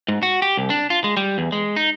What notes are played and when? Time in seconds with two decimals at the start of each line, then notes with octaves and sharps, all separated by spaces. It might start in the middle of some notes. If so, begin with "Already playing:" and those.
0.08 G#2
0.23 F#4
0.42 G4
0.57 C2
0.70 D4
0.90 F4
1.04 G#3
1.17 G3
1.38 E2
1.52 G#3
1.76 D#4